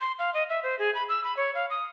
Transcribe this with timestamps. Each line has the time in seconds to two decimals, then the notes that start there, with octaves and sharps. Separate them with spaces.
0.01 C6
0.19 F5
0.34 D#5
0.49 E5
0.63 C5
0.79 G#4
0.95 B5
1.09 E6
1.24 B5
1.37 C#5
1.55 F5
1.70 D#6